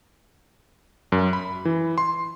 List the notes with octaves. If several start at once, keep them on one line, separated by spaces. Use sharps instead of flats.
F#2
B5
E3
C6